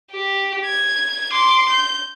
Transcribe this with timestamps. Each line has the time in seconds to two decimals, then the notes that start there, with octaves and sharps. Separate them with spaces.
0.11 G4
0.66 G#6
1.32 C6 D6
1.69 G6